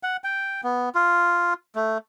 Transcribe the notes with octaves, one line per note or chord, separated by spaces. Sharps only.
F#5
G5
B3
F4
A3